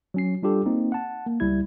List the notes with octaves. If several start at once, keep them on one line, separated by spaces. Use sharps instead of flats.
F#3 C#4 C7
G3 D4 F4 G4 A4
A#3 C4 D#4
F#5 A5
A#3
C#2 G3 E4 G#6